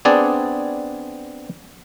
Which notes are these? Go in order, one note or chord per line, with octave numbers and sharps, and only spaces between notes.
B3 C4 D4 G#4 D5